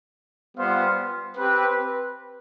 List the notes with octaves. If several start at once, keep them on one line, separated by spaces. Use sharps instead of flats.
G3 B3 F4 C5 F5
C4 G4 B4